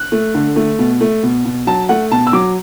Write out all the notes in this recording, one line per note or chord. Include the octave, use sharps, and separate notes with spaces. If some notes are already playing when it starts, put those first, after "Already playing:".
Already playing: F#6
A3
D3
A3
B2
A3
B2
B2
F#3 A5
A3 F#5
B2 A5
E6
F#3 D6